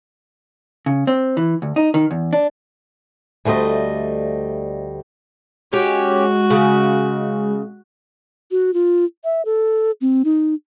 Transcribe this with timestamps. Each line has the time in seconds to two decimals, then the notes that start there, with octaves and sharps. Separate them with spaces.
0.86 C#3
1.07 C4
1.37 E3
1.62 D2
1.76 D#4
1.94 D#3
2.11 E2
2.33 D4
3.45 D2 G3 A3 C5 D#5
5.73 G#3 C#4 F#4 G4
6.50 C#3
8.51 F#4
8.74 F4
9.24 E5
9.45 A4
10.01 C4
10.25 D#4